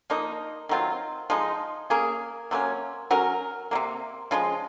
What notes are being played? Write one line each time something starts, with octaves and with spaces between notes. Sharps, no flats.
F3 A#3 D#4
D#3 F#3 C4 F4
F3 G#3 D#4
A#3 C#4 G#4
C3 F#3 A#3 C#4
F#3 C#4 F#4 A#4
C3 F#3 A#3
C#3 F3 G#3